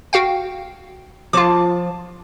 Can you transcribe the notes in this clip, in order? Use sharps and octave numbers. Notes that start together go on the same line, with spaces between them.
F#4 F5 G5
F3 F4 A5 D6